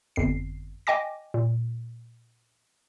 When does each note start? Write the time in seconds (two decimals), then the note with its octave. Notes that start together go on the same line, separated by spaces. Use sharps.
0.16 G1 F2 C7
0.87 D#5 G5 G#5 D6 A#6
1.34 A#2